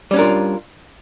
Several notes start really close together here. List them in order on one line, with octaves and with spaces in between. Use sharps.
G3 C#4 D4 A#4 F4